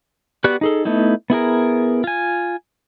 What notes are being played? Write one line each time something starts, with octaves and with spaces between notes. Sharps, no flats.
B3 F#4 G4 D5 F#6
D#4 G#4 A4
A3 B3 D#4 E4
B3 E4 G#4 A#4
F4 G#5